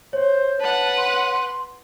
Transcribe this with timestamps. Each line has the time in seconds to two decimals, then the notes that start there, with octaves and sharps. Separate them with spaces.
0.13 C5 C#5
0.60 B4 F#5 A5
0.97 C6